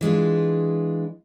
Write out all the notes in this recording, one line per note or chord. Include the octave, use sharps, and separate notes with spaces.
E3 G#3 D4 F4